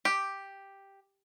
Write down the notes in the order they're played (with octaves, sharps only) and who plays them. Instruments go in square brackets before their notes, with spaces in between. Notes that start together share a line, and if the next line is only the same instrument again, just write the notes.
[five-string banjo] G4